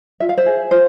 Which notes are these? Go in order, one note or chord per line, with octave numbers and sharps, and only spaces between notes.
F4 E5
F5
C5 E5
G#4
F4 C5